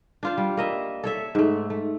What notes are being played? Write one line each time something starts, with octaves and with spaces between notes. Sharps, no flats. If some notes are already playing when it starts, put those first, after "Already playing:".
D4 F4 C5
G3
A#3 D#5 E5
A4 C#5 E5
G#2 A3
A3